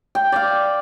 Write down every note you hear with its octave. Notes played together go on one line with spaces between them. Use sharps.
G5
D5 F5